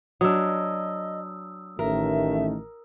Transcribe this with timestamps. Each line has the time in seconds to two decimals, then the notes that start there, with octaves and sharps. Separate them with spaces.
0.21 F#3 D4 D#5 D#6 E6
1.79 A1 D#3 A3 A#4 E5